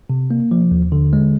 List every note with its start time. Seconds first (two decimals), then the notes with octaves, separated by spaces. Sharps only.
0.10 C3
0.31 A#3
0.51 F3
0.71 D#2
0.92 D3
1.13 G#3